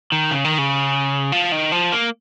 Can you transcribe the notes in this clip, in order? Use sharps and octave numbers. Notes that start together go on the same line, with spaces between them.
D#3
C#3
D#3
C#3
F3
D#3
F3
A#3